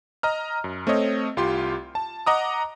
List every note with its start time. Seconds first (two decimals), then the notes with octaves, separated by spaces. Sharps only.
0.23 D#5 A#5 F6
0.64 F#2
0.87 A3 C4 C5 C#5 D#5
1.37 C2 F4 G4 C6
1.95 A5
2.26 D#5 F#5 A#5 D6 D#6